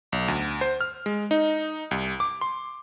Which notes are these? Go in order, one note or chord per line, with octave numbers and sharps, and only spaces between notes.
B1
D2
C5
F6
G#3
D#4
C2
D6
C6